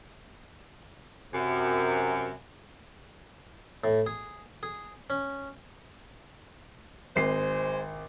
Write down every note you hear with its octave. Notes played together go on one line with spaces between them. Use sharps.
F#2 C3
A2
G#4
G#4
C#4
G#1 G#3 C5 C7